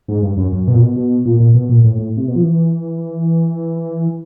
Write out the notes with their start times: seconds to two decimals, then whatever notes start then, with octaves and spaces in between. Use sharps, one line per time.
0.08 G#2
0.22 G2
0.37 F#2
0.52 F#2
0.67 B2
0.74 A#2
0.82 B2
0.96 B2
1.25 A#2
1.40 A#2
1.54 B2
1.69 A#2
1.84 A2
1.99 A2
2.17 C3
2.28 B2
2.36 F3
2.43 E3